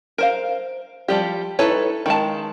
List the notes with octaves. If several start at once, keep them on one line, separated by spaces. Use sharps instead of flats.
A#4 C5 F5
F3 G3 G4
D#4 E4 A4 B4 C#5
D#3 G#3 A5